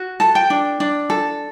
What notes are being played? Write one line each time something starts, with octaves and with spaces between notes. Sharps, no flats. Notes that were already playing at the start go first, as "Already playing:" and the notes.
Already playing: F#4
A4 A5
G5
D4
D4
A4